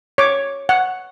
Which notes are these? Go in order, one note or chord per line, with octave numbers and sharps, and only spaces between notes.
C#5 D6
F#5